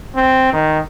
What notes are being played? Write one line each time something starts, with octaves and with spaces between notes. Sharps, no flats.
C4
D#3